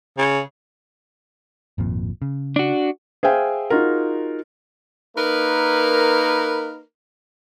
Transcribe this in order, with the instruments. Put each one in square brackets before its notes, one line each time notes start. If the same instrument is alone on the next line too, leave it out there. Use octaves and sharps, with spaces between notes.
[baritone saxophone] C#3
[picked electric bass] G#1 F2 A#2
C#3
[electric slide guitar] D4 F#4
[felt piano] G#4 C5 E5 F5 G5 G#5
D#4 F4 F#4 G#4 A#4
[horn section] A#3 D#4 A#4 B4